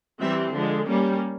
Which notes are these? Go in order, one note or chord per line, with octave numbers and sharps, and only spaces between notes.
E3 G3 C4 E5
D3 F3 G#3
G3 A#3 C#4